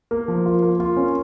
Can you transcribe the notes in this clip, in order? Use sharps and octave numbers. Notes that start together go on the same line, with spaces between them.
A#3
F3
F4
A#3
F4
C#4